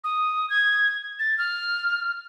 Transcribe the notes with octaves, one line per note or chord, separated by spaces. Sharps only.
D#6
G#6
A6
F6